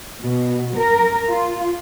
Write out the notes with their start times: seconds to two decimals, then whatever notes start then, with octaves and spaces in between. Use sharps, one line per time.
0.23 B2
0.77 A#4
1.29 F4